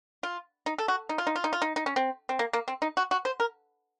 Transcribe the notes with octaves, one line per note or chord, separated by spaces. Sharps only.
F4
D#4
A4
F#4
D#4
F4
D#4
F4
D#4
F4
D#4
D#4
C#4
C4
C4
A#3
A#3
C4
D#4
F#4
F#4
C5
A#4